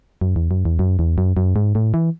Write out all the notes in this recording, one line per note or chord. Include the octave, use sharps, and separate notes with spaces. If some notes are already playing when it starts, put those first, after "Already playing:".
F#2
E2
F#2
E2
F#2
E2
F#2
F#2
G#2
A2
E3